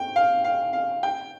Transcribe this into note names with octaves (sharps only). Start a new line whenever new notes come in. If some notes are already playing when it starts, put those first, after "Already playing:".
Already playing: G5
F5
F5
F5
G5